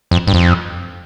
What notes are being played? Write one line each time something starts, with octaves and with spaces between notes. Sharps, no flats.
F2
G2
F2